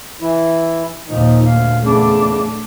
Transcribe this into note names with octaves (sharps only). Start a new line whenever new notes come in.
E3 E4
D#2 A#2 D#3 F3 D#4
D2 F5
E2 C#3 A3 D4